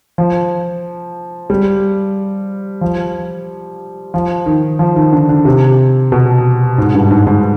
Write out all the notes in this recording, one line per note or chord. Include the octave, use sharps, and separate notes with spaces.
F3
G3
F3
F3
D#3
F3
D#3
D3
D3
C3
B2
G#2
G2
G#2
G#2